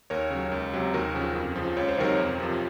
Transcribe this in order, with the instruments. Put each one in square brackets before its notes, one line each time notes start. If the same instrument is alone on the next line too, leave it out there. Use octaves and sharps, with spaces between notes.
[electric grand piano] D#2 A#4 C#5
C#3 F#3
C#2
C3 F#3
D#2 F#4 A#4
C#3 F3
F2
C#3 F3
C#2 C#5
C5
C3 D#3 F#3 A#4 C#5
F2
C3 F3